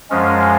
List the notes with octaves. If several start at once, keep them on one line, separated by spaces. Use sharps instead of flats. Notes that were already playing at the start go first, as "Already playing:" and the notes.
F#2 F3 G#3 C#4